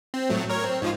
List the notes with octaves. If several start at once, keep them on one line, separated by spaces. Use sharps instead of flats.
C4
A2 F#3 A3
A#4 C#5
C4
G#2 F3 F4